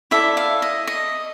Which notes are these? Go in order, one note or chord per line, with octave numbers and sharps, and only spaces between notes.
E4 A4 D5 E5
F5
D#5
D#5